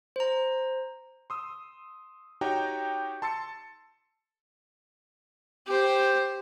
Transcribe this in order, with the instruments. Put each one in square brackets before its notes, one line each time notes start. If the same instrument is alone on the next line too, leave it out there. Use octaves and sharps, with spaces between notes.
[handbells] C5 A#5
[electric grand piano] C6 D#6 E6
D#4 F#4 G4 C#5 G5 A#5
A5 C6 E6 A6 C#7
[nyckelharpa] G4 C5